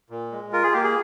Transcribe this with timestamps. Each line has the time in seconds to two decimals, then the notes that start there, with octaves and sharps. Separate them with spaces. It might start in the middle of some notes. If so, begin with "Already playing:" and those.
0.10 A#2
0.32 G#3
0.53 F4 A#4
0.63 G#4
0.73 A#3 G4
0.83 G#4